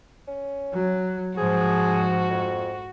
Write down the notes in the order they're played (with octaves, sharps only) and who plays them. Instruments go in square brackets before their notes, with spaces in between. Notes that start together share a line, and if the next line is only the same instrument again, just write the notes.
[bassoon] C#4
[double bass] F#3
[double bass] G#2 [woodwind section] F3 [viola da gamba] F#4 [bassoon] G#4
[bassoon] F2